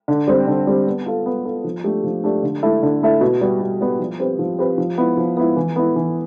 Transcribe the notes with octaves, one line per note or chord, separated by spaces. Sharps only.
D3
G3 C4 G4
D3
G3 C4 G4
B3
F4 A4
B3
F4 A4
F3
A3 D4 G4
F3
A3 D4 G4
D3
A3 E4 A4 E5
D3
A3 E4 A4 E5
B2
G3 B3
B2
G3 B3
F3
C4 G4 B4
F3
C4 G4 B4
F3
B3 E4
F3
B3 E4
E3
B3 E4
E3